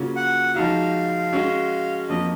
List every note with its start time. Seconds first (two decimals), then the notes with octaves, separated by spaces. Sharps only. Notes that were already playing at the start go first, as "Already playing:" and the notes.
Already playing: C#3 F#3 A#3 C#4 F4
0.16 F#5
0.55 F3 G#3 D#4 F#4 F5
1.33 G#3 C#4 F#4
2.08 F2 F3 A#3 C#4 D#5